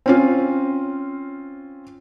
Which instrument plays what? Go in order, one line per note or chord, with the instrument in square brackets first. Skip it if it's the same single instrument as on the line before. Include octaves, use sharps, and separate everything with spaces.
[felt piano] C4 C#4 F4